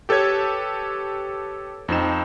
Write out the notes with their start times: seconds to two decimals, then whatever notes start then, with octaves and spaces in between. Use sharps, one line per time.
0.09 G4 A4 B4 C#5 G#6
1.88 F2 C4 D#4 E7